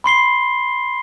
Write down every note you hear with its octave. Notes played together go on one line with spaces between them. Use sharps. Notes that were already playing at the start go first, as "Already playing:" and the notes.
B5 C6 C7 G7